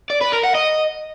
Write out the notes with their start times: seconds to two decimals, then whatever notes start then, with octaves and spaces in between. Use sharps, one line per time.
0.10 D5
0.21 B4
0.33 A#4
0.44 F#5
0.55 D#5